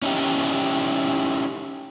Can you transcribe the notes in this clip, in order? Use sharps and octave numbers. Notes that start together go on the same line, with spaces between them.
C#4 D#4 E4 G4